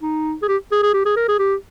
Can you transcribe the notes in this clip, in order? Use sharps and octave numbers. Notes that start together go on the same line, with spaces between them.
D#4
G#4
G4
G#4
G#4
G4
G#4
A#4
G#4
G4